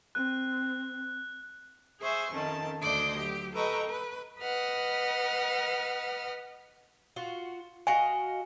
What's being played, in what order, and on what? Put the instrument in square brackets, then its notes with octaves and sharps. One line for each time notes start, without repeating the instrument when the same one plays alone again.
[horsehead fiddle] C4 [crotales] F#6
[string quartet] G#4 C5 E5 G#5 C#6
F2 D#3 C#4 A5
D2 D4 D5 D#5 C6 G6
F#3 G4
A4 B4 D#5 G5 A#5 C#6
B4
B4 D#5 F#5 F6
[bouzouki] F4 F#4
[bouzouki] F#4 D#5 F5 [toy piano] G#5